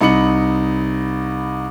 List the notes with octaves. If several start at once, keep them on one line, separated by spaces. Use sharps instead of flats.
C2 D#4 B5 C#7 F#7